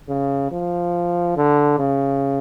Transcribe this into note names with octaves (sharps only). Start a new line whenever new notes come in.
C#3
F3
D3
C#3